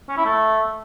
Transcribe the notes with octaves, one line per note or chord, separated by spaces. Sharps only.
C#4
E4
A3